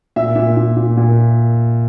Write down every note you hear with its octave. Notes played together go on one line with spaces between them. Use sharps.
A#2 E5
A#2
A#2
A#2
A#2